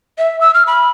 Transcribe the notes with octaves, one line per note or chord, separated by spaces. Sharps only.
E5
E6
F6
B5